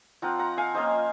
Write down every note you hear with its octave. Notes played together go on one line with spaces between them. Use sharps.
F3 C4 F4 F#5 A#5
F#5 A#5
F5 G#5
F3 A#3 C#4 F4 C5 D#5